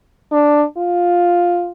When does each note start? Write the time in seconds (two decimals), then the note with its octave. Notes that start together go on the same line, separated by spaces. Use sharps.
0.32 D4
0.77 F4